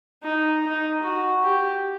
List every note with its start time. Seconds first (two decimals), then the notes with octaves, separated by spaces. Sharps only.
0.23 D#4
0.64 D#4
1.02 F#4
1.42 G4